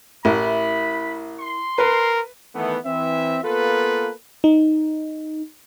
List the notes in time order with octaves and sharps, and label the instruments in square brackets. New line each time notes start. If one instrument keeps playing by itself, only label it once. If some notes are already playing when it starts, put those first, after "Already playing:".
[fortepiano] A1 [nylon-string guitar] E4 A#4 [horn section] B5
[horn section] C6
[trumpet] A#4 [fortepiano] B4
[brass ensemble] D#3 E3 A3 B3
E3 C4 E5
A#3 B3 F4 A4 B4
[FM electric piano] D#4